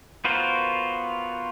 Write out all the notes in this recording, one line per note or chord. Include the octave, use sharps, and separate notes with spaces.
B3 F4 F#4 A#4 C5